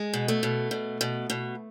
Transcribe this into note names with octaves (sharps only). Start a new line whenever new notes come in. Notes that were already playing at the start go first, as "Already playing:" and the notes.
Already playing: G#3
B2
A3
B2
B2
B2
B2